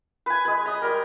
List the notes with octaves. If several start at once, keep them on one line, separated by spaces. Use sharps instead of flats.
B4 G#5
G#3 B4
D#5 A#5
G3 A#4